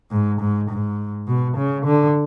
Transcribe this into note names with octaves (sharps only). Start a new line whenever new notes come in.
G#2
G#2
G#2
B2
C#3
D3